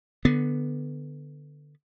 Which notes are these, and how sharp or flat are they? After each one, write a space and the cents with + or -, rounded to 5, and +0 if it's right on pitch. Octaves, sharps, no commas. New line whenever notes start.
D3 +5 B3 +0